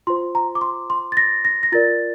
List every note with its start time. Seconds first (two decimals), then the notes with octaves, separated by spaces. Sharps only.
0.07 F4 C5 C6
0.35 A#5
0.55 D6
0.61 C6
0.90 C6
1.12 A6
1.17 A#6
1.45 A#6
1.63 A#6
1.72 F4 A#4 D5 A6